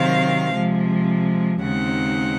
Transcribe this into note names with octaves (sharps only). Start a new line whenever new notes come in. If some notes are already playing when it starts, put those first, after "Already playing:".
Already playing: C3 D#3 F#3 C4 F5
C3 F3 G#3
D#2 C#3 G#3 C4 D#4 F#5